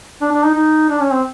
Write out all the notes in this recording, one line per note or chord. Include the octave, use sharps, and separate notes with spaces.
D4
D4
D#4
D#4
D4
C#4
C4